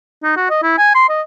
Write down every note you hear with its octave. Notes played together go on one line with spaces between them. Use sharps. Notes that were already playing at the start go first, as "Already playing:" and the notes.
D#4
F#4
D#5
E4
G#5
C6
D#5